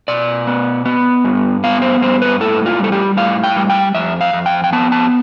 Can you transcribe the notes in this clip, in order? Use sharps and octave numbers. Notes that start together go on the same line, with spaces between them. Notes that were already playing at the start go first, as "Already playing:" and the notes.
B2 D5
B3
B3
G2
B3 F5
C5
G2 C5
B4
A2 A4
F4
G3 A4
G4
A2 F5
G5
G3
G5
F2 E5
F5
F2
G5
G5
B3 A5
A5